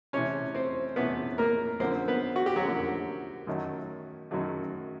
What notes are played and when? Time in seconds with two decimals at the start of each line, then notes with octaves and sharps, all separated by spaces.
0.13 C3 E3 A3 C#4 C#5
0.55 C4 C5
0.96 C3 E3 A3 B3 C#4 B4
1.38 A#3 A#4
1.80 F#2 D3 F3 A#3 C4 C5
2.08 B3 B4
2.36 F#4
2.46 G4
2.56 F#3 F#4
2.63 F#2 D3 F3 A#3
3.47 F#2 D#3 F#3 A3
4.31 F#2 D#3 F#3 A3